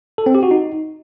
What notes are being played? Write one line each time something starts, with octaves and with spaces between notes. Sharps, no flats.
A4
C4
G4
F#4
D#4